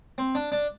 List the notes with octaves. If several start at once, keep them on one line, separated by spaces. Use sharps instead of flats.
C4
D4
D4